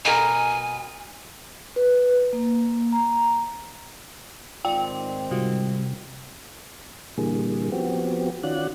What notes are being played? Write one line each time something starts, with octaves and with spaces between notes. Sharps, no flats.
B2 A#4 G#5
B4
A#3
A#5
G#2 D#3 C4 F4 D5 G5
C3 G3 F4 F#4
A#2 D3 E3 G3 A#3 G#4
F3 B3 C4 F#4 G4
D#3 C#4 F4 F#4 D5 F#6